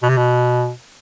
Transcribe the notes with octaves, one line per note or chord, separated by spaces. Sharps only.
B2
C3
B2